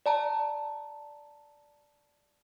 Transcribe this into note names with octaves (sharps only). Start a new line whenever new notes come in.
D5 A5 A#5